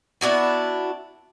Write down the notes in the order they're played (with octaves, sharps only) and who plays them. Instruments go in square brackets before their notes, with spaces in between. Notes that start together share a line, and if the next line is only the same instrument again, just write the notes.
[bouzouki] B3 D4 E4 F#4